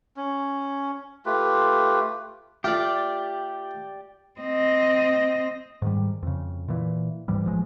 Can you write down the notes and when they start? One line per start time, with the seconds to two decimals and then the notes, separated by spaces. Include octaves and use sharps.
0.17 C#4
1.26 A3 F4 G4 B4
2.64 A3 F4 G4 D5
4.40 C4 D#5
5.82 G#2 D#3 G3
6.23 F2 C#3
6.68 A#2 E3
7.28 D1 G#2 E3 G3
7.45 A1 F3 G#3